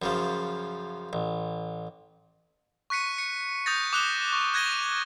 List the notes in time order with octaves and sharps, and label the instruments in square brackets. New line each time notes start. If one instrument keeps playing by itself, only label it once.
[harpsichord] F#2 C#3 F3
A1
[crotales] C#6 F#6 B6 C#7 D#7
C#7
D#6 G6 A6 A#6
D6 D#6 F#6 E7 G7
C#6
F#6 G#6 A#6 D#7 G7